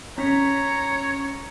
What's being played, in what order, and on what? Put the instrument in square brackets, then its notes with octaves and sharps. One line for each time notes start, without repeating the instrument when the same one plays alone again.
[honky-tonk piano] C#4 B6 [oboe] C#5 [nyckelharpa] A#5